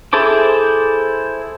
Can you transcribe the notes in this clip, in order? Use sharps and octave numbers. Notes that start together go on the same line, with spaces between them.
E4 G#4 A4 C5 D6